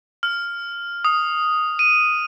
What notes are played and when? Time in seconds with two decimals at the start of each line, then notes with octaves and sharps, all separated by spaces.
0.23 F6
1.05 D#6
1.79 D#7